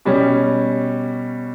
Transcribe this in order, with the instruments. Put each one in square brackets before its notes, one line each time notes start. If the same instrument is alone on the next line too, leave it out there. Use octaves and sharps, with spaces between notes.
[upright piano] B2 G3 C#4